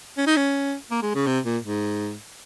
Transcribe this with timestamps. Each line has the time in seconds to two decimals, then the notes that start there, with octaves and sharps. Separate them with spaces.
0.18 C#4
0.27 D#4
0.37 C#4
0.91 A#3
1.03 G#3
1.15 C#3
1.27 C3
1.45 A#2
1.64 G#2